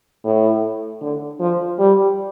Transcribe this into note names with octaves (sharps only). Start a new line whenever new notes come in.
A2
D3
F3
G3